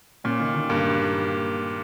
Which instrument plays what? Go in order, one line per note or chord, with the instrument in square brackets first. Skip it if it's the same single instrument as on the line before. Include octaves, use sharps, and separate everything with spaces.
[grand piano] A#2 [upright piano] C#4
[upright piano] D#3
D#3
[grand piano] G2 G3 [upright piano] A#3